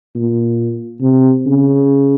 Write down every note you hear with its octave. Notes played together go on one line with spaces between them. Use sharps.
A#2
C3
C#3